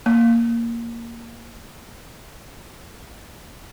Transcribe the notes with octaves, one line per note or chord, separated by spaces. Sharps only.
A#3